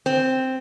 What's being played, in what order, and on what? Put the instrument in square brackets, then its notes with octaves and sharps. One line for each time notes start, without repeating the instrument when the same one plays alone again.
[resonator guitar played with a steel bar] C4